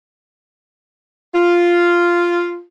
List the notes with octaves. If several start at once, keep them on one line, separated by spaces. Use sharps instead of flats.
F4